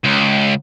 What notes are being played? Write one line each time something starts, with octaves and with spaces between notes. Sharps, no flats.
C#2